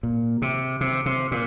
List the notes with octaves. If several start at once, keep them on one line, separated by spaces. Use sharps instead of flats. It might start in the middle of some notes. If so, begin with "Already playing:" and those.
A#2
C3
C3
C3
A#2